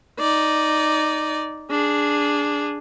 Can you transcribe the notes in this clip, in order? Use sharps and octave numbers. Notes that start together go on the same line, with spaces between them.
D#4 D5
D4 G#4